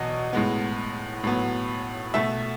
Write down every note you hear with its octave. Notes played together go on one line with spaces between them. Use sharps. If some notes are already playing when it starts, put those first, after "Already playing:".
Already playing: E2 B2 F#3 D#5
A2 G#3 B3
A2 F#3 B3
B2 A3 E5